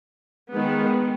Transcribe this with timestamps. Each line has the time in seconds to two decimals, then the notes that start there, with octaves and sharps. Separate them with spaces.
0.54 D#3 G#3 B3